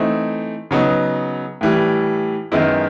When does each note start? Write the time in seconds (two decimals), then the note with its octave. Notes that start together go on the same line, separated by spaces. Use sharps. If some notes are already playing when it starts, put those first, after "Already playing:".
Already playing: E3 A3 C4 D#4
0.71 C#3 F#3 B3 D#4
1.61 A2 E3 G3
2.52 F#2 D#3 G#3 B3 E4